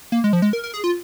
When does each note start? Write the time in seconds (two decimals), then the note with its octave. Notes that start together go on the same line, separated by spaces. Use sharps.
0.12 A#3
0.24 G#3
0.33 F3
0.42 G#3
0.53 A#4
0.64 A#4
0.74 G#4
0.84 F4